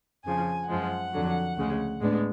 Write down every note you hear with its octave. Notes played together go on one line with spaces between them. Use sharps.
F2 C#3 F3 G#5
F#2 F3 G#3 F#5
F2 D3 F#3
D2 C#3 G#3
A2 G#3 B3 D4